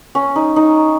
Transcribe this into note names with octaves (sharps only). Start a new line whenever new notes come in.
C#4
D#4
D#4